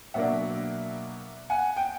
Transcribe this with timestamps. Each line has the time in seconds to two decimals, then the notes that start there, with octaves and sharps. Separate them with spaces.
0.14 B2 F#3 A#3 D4 E5 F#5
1.50 F#5 G#5
1.76 G5